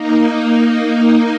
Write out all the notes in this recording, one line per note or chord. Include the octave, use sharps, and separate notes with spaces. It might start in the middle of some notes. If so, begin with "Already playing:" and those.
Already playing: A#3 D#4